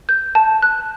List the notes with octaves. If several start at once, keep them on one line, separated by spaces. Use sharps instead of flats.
G6
A5
F#6